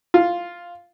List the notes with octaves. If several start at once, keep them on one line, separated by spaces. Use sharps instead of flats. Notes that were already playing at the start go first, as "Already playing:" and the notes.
F4